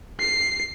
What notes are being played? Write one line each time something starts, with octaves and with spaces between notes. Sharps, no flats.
C7